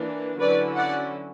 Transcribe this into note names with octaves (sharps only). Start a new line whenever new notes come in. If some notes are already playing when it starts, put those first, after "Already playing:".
Already playing: E3 A#3 D4
D3 F#3 C#4 E4 B4 D5
D5 F#5